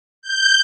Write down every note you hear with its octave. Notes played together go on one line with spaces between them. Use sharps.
G6